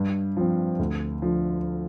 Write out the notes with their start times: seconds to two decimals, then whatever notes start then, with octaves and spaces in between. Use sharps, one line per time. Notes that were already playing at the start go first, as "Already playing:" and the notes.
Already playing: G2
0.37 F3 C4
0.79 D2
1.22 D3 F3